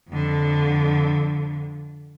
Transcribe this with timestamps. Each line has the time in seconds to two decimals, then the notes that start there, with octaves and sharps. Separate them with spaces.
0.10 F2 D3